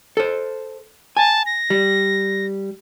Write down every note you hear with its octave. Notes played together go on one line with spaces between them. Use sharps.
A4 C5
G#5 A5
A#6
G3